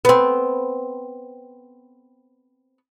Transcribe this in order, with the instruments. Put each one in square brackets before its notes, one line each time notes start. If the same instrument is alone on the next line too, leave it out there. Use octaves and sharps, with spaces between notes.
[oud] B3 C4